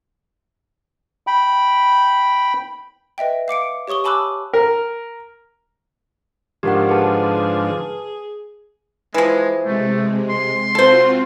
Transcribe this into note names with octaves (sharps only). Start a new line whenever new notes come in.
G5 B5
B4 D#5 E5 G5
F5 D6 C#7 D7
G4 C#5 C#6 D#6 G7
G#5 A5 B5 D6 E6 F#6
A#4
G#2 D3 F3 G4 A#4 F#5
G#4 B4 A5
E3 F3 G#3
C3 G#3 A3
C6
C4 F4 F#4 A4 C5